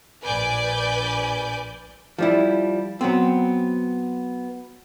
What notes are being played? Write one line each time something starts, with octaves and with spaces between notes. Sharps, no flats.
A#1 B4 D5 G#5 D6 G6
F3 G3 E4
F#3 B3 C4